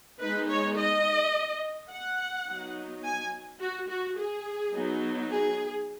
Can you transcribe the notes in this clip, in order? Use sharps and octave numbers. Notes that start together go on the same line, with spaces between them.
G#3 B3 D#4 B4
C#5
D#5
F#5
F#3 B3 D#4
G#5
F#4
F#4
G#4
F#3 B3 D#4
G#4